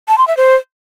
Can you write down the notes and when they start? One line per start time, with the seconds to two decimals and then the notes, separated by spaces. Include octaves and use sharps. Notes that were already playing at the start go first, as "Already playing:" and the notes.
0.08 A5
0.18 C6
0.28 E5
0.37 C5